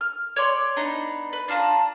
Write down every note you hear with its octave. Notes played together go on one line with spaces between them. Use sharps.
F6
C#5 D5 C6
B3 D4 D#4 A#5
B4
D4 F4 A5 A#5